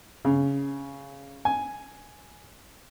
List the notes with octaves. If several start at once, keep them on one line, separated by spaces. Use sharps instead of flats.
C#3
G#5